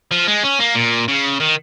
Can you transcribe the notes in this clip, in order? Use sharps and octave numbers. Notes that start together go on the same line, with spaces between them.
F3
G#3
C#4
A#3
A#2
C#3
D#3